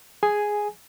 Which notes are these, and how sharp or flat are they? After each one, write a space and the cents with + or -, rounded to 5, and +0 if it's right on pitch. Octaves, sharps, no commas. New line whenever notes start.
G#4 +0 G#5 +0